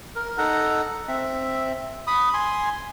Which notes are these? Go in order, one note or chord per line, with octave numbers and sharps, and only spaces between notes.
A#4
D#4 A4 F#5 A#5
C4 E5
B5 D#6
G#5 C6